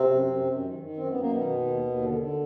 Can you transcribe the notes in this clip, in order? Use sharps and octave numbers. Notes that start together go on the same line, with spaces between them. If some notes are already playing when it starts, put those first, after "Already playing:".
Already playing: C3 C4
F#2
F#2
F#2
D#3
D#3
F#2 C4
B3
F#2
A#3
B2 D#3 B3
D#3
D#2
D#2
D3
D3